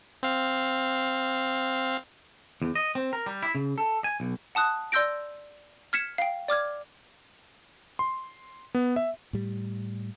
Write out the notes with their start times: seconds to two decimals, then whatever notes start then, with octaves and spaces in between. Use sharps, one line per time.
0.23 C4 F5
2.62 E2
2.75 D#5
2.95 C4
3.13 A#4
3.26 G3
3.43 E4
3.55 C#3
3.78 A4
4.04 G#5
4.20 B1
4.55 F#5 A5 D#6 F#6
4.92 D5 C6 E6 G6 A#6 D7
5.93 F6 G#6 B6 C#7 E7
6.18 F5 G5
6.48 D5 D6 F6 G#6
7.99 C6
8.75 B3
8.96 E5
9.33 A2 G3